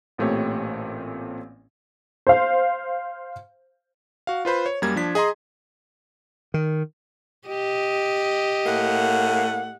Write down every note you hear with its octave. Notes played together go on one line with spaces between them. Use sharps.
A1 A#2 A3 C4 G4 C#5
C5 F5
F#4 F5
F4 B4 C5 B5
C#5
F#2 G3 A#3 G#6
F3 D4 B6
G#4 D#5 G#5 A#5 C6
D#3
G4 D#5
A2 A#3 F#5